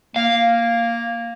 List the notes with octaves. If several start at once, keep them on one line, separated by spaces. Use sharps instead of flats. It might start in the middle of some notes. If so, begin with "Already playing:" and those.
A#3 F5